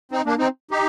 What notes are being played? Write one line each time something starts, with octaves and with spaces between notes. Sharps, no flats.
C4 D#4
A#3 D4
C4 D#4
D#4 G4